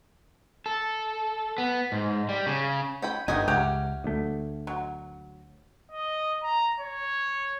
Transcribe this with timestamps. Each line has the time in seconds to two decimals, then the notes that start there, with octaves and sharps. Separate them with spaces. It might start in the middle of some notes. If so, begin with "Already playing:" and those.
0.66 A4
1.58 B3
1.92 G#2
2.29 G3
2.47 C#3
3.02 C#4 G5 B5
3.28 G1 D3 D#3 A3 B3 G4 D#5 G#5
3.48 C#2 C#4 G4 E5 F#5
4.04 D2 A3
4.67 F#3
5.92 D#5
6.43 A#5
6.80 C#5